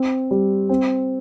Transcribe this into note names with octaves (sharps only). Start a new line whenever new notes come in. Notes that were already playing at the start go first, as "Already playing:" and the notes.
Already playing: C4
G3
C4